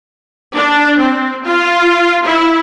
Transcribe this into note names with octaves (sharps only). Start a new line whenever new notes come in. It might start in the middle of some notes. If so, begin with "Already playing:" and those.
D4
C4
F4
E4